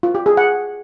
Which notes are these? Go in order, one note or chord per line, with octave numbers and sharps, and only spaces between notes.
F4
G4
G#4
F#5